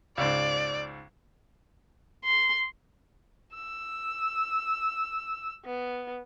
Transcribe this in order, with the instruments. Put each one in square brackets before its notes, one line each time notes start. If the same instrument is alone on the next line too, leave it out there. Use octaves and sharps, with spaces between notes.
[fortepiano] C#2 G#2 [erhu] D5
[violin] C6
[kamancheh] E6
B3